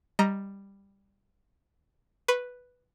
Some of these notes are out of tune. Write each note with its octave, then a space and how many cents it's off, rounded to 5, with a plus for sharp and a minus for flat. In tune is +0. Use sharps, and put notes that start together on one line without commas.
G3 +10 D#5 +0 A#5 +15
B4 +0 C#6 -40